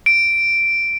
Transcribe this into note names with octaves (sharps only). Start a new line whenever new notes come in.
D7